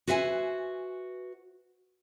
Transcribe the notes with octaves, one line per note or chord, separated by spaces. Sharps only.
F#4 B4 C5 E5 G5 G#5